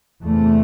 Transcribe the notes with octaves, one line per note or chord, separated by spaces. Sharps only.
E2 C3 A3